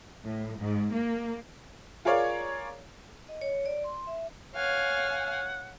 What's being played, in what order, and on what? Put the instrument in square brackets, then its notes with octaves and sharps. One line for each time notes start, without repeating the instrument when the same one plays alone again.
[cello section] A2
G#2
A#3
[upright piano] F4 G#4 A#4 C#5 D5 F5
[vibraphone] D#5
C#5
D5
C6
E5
[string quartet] C#5 F5 G#5 [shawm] F#5